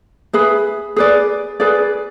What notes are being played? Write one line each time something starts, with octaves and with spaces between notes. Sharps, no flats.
G#4 B4 E5
G#4 B4 D5
G#4 B4 D5